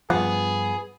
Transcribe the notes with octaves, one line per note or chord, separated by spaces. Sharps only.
G2 F3 B3 G#4